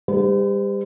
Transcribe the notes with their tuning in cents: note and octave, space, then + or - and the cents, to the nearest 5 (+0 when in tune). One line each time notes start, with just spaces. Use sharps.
G3 +30 C5 -45